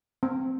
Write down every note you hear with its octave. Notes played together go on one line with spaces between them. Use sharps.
C4